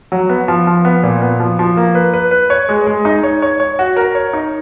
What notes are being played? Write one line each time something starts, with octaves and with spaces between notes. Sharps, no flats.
F#3
B3
F3
F3
B3
A#2
B3
F3
F3
A#3
B4
B4
B4
C#5
G#3
G#3
D#4
C#5
C#5
C#5
F#4
A#4
C#5
D#4